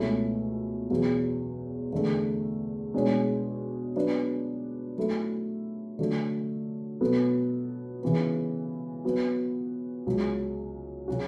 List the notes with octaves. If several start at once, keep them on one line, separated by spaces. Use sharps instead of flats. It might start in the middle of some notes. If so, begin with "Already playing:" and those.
Already playing: C#2 B2 A3 C#4 E4
E2 B2 F#3
E2 D3 A3
B2 G#3 D4 G#4 C#5
F#3 B3 D4
F#3 A3 E4 A4
D3 F#3 A3
B2 F#3 B3 F#4 A4
C#3 E3 B3
F#3 B3 F#4
C#2 C#3 F#3
C#3 F#3 C#4 F#4